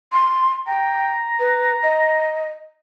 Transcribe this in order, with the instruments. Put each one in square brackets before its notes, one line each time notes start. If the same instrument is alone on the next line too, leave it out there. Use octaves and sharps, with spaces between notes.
[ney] C6
[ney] G5 [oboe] A#5
[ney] B4
D#5